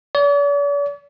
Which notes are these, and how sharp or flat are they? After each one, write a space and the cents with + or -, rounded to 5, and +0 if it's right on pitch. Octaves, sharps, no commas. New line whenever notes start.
D5 -45